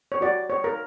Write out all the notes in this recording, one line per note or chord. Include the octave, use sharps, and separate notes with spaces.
C#5
F#4 D5
C#5
A#4